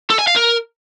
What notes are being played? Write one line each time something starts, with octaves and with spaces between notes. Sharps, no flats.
A4
G#5
F5
A#4